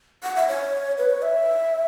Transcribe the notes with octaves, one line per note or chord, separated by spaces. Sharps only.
F#5
E5
C#5
B4
C#5
E5